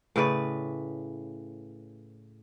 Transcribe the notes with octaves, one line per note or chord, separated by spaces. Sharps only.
A2 C#3 B4 D5